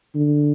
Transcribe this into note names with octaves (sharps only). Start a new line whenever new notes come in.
D3